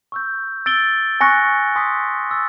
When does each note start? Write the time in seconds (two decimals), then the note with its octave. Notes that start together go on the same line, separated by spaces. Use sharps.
0.12 C#6 E6 G6
0.66 E6 A6 D7 G7
1.21 G#5 C#6 F#6 A#6 C#7
1.76 G#5 C6 D#6 F#6 B6
2.31 C#6 E6 A6